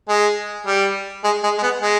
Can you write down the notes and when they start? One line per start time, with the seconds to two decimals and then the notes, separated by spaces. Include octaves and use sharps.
0.09 G#3
0.67 G3
1.24 G#3
1.43 G#3
1.58 G#3
1.63 B3
1.81 G#3